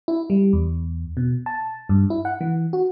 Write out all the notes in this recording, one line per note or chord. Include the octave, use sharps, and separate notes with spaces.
E4
G3
E2
B2
A5
G2
E4
F#5
E3
F#4